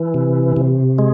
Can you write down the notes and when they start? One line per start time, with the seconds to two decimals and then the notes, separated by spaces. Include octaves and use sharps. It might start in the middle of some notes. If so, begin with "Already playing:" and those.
Already playing: E3
0.14 C3
0.56 C3
0.98 G#3